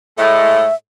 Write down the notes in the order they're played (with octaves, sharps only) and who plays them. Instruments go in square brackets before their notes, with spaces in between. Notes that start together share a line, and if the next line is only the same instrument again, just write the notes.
[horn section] A2 G#3 A3 [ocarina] E5